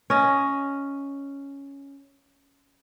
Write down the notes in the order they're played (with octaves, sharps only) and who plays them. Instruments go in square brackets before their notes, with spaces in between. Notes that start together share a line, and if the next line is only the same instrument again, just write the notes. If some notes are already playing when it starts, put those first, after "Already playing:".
[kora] C#4 D#5